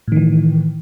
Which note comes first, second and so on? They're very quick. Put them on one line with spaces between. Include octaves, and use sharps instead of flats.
A2 D#3 E3